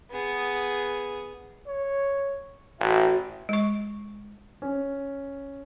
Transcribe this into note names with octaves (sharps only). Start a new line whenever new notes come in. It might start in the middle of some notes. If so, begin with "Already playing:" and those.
B3 G#4
C#5
A1 F#4 E5
G#3 C#6
C#4